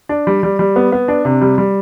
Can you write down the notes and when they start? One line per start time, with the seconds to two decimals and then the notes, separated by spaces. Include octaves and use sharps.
0.09 D4
0.27 G3
0.43 G3
0.59 G3
0.76 B3
0.92 B3
1.08 D4
1.25 C3
1.41 G3
1.58 G3